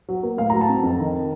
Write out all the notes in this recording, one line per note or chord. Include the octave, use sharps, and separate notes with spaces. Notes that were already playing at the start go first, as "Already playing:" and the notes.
F#3
A#3
A2 F5
F#3 A#5
A5
C4
F2
D#3